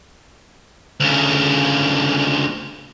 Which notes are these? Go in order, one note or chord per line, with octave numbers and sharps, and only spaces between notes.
D2 C#3